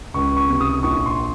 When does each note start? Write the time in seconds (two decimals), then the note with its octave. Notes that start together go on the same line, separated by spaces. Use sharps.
0.14 C#2 C#6
0.37 C#6
0.49 C3
0.61 D#6
0.83 A#1 C#6
1.06 C6